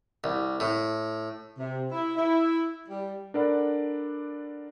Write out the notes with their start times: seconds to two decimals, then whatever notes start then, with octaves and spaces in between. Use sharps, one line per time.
0.24 C2
0.60 A2
1.58 C3
1.91 E4
2.16 E4
2.88 G3
3.34 D4 A4 A#4 D5 F#5 B5